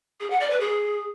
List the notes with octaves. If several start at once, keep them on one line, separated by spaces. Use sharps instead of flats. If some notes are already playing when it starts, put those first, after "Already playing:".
G#4
F#5
D5
B4
G#4